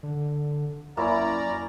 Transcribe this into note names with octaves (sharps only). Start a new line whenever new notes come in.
D3
F#2 A#3 C#4 E4 D5 A#5